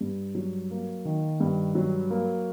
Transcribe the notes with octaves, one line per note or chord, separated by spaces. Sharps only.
G2
F#3
A#3
D#3
G2
F#3
A#3